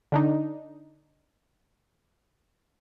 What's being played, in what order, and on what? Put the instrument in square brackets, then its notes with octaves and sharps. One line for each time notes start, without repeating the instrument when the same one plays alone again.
[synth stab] D3 D4 D#4